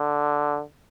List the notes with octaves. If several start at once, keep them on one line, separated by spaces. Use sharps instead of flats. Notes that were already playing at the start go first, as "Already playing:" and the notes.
Already playing: D3